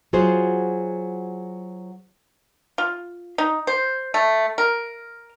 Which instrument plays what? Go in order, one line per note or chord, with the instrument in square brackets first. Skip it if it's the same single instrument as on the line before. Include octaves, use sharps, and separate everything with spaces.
[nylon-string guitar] F#3 F4 F#4 G#4 C5
[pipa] F4
D#4
C5
A3
A#4